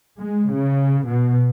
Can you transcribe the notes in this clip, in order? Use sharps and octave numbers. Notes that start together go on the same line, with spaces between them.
G#3
C#3
B2